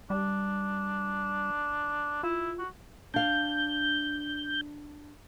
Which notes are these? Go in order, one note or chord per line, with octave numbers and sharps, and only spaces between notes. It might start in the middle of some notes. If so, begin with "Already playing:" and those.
G3 D4
E4 F4
F#4
D4 F5 G6